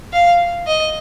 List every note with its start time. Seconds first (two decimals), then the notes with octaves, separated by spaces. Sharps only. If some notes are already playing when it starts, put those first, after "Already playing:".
0.13 F5
0.67 D#5